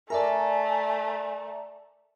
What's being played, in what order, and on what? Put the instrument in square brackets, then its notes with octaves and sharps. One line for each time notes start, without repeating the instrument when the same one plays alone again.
[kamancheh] A3 [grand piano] A#4 [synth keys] D5 E5 A#5 [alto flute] G#5